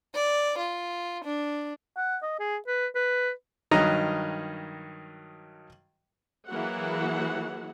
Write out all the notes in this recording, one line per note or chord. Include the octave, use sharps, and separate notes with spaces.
D5
F4
D4
F#5
D#5
G#4
B4
B4
G2 D#3 F#3 D#5 A#5
E3 F#3 A#3 E4 G#4 F#5